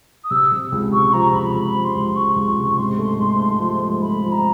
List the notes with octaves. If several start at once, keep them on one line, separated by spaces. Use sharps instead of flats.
D#6
C3 E6
C3
C#2
C3 C#6
F3 A#5
C#2 B5
C#2 B5
F3
C6
C#2
F3 C#6
C#2
C#6
C3
G#2 C6
A3
G#2
A3
F3
A3
A3 B5
F3
A#5